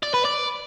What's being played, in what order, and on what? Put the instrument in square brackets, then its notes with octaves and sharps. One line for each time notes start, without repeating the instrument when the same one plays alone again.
[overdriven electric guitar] D5
B4
D5